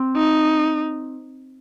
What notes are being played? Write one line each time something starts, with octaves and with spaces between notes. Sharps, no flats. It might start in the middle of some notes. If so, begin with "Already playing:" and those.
Already playing: C4
D#4